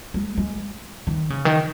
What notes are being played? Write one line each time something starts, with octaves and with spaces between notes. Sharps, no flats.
G#3
G#3
D#3
C#3
D#3